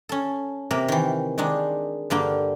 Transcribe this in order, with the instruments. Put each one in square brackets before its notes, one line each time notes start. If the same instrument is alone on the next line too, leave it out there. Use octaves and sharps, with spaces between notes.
[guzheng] C#4 A4
C3 A#3 A#4 E5
D#3 E3
D#3 G#3 D4 D#4
G2 D3 A#3 G5